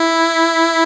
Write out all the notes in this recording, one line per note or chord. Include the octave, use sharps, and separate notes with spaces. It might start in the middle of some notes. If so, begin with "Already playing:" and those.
Already playing: E4